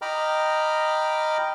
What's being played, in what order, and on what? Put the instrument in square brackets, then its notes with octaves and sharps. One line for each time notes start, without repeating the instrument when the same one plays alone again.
[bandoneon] D#5 G5 A#5 B5 D6 F6